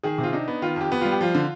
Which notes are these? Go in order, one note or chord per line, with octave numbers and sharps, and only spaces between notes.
D#3 G#4
C3
F4
D4 D#4
B3
D#3 F4
F2 G4
B3
G3 F4
G4
F3 F4
D3